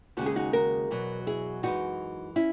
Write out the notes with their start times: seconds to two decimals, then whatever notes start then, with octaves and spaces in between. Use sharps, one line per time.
0.17 D#2 C#3 G#3 F#4
0.26 G#4
0.36 D#4 F#4
0.53 F#4 A#4
0.91 E2 B2 F#3
1.27 E4 G#4
1.63 F#2 E3 G#3 D#4 F#4
2.36 C#4 E4